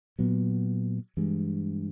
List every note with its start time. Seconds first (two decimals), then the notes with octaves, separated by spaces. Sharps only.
0.19 A#2 F#3 B3
1.17 G2 E3 G#3